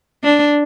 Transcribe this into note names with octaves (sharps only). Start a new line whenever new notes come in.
D4